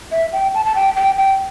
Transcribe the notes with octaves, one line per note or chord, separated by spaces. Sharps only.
E5
G5
A5
A5
G5
G5
G5